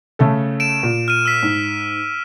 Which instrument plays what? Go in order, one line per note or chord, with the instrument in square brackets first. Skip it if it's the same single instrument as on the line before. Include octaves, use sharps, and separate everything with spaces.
[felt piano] C#3 A3 A4
[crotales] D7 E7
[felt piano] A#2
[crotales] F6 D#7
E6 B6
[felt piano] G#2